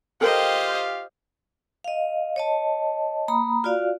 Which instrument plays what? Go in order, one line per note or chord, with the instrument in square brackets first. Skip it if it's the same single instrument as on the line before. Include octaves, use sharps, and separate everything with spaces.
[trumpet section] F4 G4 F5 [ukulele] A4 A#4 G5 [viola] C5 D#5
[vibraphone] D#5 F5
C#5 D#5 A5
A#3 A#5 B5 D#6
F4 F#4 D5 F5